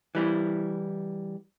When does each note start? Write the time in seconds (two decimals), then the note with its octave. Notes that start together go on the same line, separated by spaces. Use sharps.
0.15 E3 G3 E4